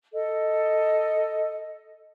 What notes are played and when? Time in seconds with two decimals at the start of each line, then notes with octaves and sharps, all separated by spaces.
0.13 A4 D#5